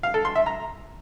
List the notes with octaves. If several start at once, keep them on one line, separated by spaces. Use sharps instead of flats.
F5
A4
C6
E5
A#5